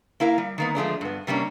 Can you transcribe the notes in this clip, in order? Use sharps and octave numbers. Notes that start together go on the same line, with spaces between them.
A#3 E4 A#4 F5
G3
D#3 A#3 B3
F3 G#3 A3 D4
G2 B3
C3 G3 A#3 C#4 D4